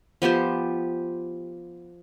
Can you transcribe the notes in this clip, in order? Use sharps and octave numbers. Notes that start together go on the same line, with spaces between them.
F3 B3 G4 C5